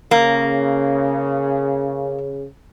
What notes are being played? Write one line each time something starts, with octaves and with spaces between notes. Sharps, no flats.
C#3 A#3